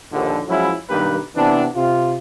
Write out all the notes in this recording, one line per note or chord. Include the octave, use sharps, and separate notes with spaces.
A#1 D#2 D3
F3 F#3 G#3 C#4 E4
B1 G2 D#3 A#3 G4 B4
C3 E3 B3 C4 D4
C3 F4